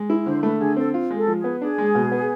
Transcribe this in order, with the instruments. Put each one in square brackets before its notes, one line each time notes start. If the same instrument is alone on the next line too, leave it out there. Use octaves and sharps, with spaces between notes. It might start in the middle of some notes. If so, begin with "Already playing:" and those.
Already playing: [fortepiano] G#3
E4
[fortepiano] D3 [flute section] C5
[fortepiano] A3 [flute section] B4
[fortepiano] D3 [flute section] G#4
[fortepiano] C4 [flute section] A4
[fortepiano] F4
G#3
[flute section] A4
[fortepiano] F3
[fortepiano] B3 [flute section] G#4
[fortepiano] D4 [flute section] G#4
[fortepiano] G#3
B2
B3